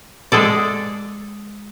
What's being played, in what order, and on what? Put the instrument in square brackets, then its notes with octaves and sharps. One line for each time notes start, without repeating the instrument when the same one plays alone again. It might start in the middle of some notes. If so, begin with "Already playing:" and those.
[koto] G#3 G#4 A4 D5